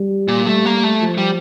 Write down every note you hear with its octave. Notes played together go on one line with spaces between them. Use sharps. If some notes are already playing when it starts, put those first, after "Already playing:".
Already playing: G3
A#2
G3 A3
A#3
A3
F3
G3